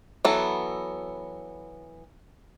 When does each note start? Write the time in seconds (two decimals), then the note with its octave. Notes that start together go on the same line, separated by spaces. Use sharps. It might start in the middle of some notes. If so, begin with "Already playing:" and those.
0.25 E3 F#3 B3 A4